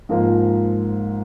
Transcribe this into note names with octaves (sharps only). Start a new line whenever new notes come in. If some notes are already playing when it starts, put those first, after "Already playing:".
G#2 F3 A#3 F4